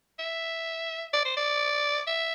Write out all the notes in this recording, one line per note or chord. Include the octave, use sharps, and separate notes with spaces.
E5
D5
C5
D5
E5